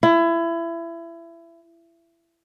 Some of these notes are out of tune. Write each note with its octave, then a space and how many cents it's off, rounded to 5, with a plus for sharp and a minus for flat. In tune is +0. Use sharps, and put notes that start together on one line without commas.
E4 +25